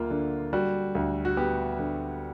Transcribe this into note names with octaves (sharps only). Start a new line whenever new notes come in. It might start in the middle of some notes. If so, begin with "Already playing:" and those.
Already playing: D2 A#3 F4
D3
G3 F#4
D2
F#4
B3 G4
D3